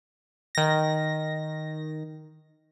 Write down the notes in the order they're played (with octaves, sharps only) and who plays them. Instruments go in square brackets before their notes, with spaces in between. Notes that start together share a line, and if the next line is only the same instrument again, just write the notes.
[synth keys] D#3 A#6